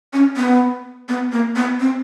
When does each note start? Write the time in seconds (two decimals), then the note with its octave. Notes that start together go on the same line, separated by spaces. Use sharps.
0.13 C#4
0.37 B3
1.09 B3
1.32 A#3
1.56 B3
1.80 C4